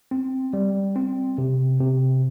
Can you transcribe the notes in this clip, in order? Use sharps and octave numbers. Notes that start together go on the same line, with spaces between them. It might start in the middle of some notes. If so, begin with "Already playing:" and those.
C4
G3
C4
C3
C3